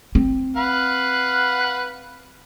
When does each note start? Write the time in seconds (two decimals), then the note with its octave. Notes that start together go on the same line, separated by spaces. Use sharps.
0.15 C4
0.56 B4 F5 F#5